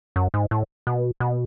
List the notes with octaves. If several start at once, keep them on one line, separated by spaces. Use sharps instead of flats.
F#2
G#2
A2
B2
B2